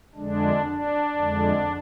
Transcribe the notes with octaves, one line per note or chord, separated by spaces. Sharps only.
F2 D3 G#3 D4
D4
F2 D3 G#3